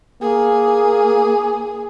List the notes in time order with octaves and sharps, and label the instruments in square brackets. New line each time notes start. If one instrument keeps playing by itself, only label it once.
[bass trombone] A#3 [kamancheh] G#4